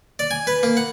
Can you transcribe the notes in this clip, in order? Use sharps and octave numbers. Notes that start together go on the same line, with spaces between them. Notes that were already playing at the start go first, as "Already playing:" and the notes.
D5
G#5
B4
A#3
F#5